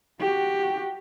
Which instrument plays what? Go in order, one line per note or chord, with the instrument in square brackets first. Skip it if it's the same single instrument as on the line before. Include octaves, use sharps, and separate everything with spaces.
[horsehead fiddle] F#4 G4